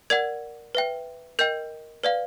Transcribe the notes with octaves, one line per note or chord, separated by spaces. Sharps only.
A#4 D5 F#5 G#6
B4 E5 G5
A#4 D#5 G5 G6
B4 D5 F5